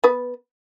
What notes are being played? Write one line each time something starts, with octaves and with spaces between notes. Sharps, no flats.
B3 B4